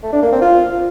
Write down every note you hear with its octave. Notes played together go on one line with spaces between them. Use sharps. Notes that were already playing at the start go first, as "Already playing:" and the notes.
A3
D4
A#3
C4
F4